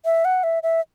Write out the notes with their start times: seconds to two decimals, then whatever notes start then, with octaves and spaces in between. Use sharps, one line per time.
0.05 E5
0.25 F#5
0.44 E5
0.63 E5